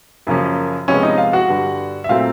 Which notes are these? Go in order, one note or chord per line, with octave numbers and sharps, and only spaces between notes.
F#2 C#3 F3 A#3 C#4
C3 F3 G#3 B3 C#4 C#5
D#4 D#5
F4 F5
F#4 F#5
G2 D3 G3
E5
A#2 F#3 A3 C4 F4 F5